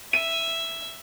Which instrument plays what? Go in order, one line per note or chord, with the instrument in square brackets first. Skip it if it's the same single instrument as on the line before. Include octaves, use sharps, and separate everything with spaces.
[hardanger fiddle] E5 [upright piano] D#7